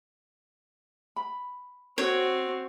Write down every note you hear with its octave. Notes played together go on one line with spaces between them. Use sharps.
B5
C4 F#4 C#5